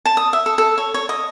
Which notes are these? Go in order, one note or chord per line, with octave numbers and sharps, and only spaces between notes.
A5
D#6
E5
A4
A4
C#5
C#5
D#5